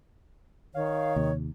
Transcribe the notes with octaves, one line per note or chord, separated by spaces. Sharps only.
D#3 C#5 F5
D#2 C3